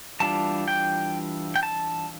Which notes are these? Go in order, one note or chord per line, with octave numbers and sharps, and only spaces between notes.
E3 G3 D4 F4 A5
G5
G5
A5